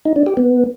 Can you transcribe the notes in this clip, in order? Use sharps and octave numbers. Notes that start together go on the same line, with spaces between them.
D#4
D4
G4
B3